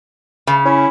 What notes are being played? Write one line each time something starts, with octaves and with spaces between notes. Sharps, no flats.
C#3
C#4 E4